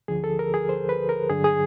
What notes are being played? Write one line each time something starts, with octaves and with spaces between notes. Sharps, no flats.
D2 D3 F3 G#4
A4
A#4
G#4
C5
B4
A#4
G2 D3 F#3 G#4
G#4